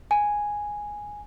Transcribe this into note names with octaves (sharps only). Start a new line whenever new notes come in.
G#5